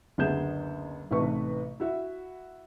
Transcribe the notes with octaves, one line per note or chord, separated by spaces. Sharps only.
F#1 D2 B3 G#4 G6 E7
A1 G#2 C3 A3 B4 C#6
E4 F#4 E5